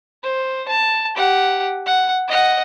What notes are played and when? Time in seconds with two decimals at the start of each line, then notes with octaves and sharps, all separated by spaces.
0.23 C5
0.68 A5
1.15 G4 F#5
1.86 F#5
2.28 D#5 F#5